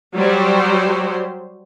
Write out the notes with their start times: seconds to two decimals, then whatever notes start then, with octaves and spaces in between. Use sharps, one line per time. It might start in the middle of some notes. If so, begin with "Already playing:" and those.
0.14 F#3 G3 F#4 G4 C5